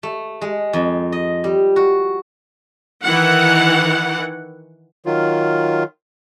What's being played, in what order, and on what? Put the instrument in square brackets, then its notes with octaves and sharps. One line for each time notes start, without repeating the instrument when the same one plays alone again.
[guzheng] A3
G#3
F2
D#5
G3
F#4
[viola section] D#3 E3 F#5
[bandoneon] D#3 F#3 F4